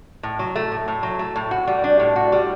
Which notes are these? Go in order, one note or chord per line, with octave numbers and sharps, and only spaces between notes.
A2
F#3
A3
A2
A2
F#3
A3
A2
F#4
G3
D4
A2
F#4
G3